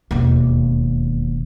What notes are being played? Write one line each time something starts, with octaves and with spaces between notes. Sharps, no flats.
E1 D#2